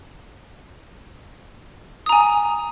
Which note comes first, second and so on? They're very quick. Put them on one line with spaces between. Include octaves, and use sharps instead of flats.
D#6 A#5 G#5